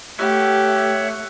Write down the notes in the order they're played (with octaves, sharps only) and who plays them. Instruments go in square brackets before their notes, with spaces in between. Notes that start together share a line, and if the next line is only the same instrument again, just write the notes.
[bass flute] A3 [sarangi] G4 [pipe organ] C#5 E5 F#5